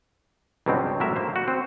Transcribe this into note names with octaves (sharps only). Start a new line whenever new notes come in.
C#2 G2 B2 F#3 C4 G4
A2 F#3 G3 A#4 E5
A#3 C5
F#4
C4